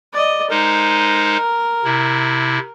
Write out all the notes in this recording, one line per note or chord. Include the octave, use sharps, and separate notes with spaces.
D5 D#5
G#3 D#4 A#4 C5
C3 E4